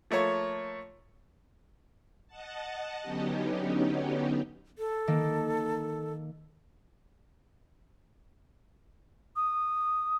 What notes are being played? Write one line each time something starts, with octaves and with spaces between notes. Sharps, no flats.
F3 A3 A#3 C#5
D#5 F#5 A5
D3 F#3 B3 C#4 D#4 G4
A4
D#3 A#3
D#6